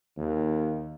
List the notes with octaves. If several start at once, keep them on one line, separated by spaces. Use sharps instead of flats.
D#2